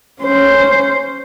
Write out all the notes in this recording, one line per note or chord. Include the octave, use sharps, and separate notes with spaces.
C#4 C5